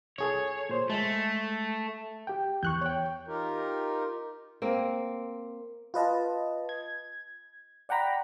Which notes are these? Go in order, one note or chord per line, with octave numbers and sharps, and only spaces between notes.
C2 G#4 A4 C#5
A#2 C5 C#5
G#3 A3
G4 G5
E2 C#6 F#6 G6
C#5 G5
D#4 F4 G4 A#4
A#3 C4
F4 B4 D#5 A5
G#6
D5 F#5 G5 A#5 B5